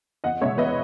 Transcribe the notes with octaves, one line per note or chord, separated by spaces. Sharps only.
E2 D#5 F#5
B2 G#3 C#5 E5
E2 B4 D#5